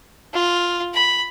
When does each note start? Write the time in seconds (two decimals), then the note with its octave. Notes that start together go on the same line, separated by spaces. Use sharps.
0.34 F4
0.94 B5